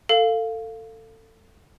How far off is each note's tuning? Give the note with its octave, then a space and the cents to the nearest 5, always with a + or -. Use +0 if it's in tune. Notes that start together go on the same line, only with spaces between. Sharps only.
A4 +25 F5 +0